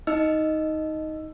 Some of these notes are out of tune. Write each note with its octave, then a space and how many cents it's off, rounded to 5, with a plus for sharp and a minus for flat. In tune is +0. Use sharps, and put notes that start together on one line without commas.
D#4 +10 D#5 +0 E6 +15